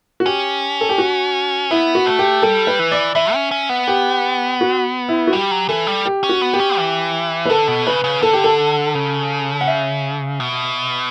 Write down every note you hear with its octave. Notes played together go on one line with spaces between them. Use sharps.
F#4
C#4 G4
A4
G4
F#4
B3 E4
F#4
A3
G4
G3 A4
B4
E3
D5
E3 E5
C#4
C#4
B3
G4
F#4
E4
F#4
G3 G4
F#3
E3 A4
G3
G4
C#4
F#4
B3
G4
C#4
E3
B4
D3 A4
B2
C#3 B4
C#3
D3 A4
G4
A4
C#3
F#5
E5
B2